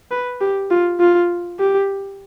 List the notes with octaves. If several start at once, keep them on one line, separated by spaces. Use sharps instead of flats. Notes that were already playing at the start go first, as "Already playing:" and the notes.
B4
G4
F4
F4
G4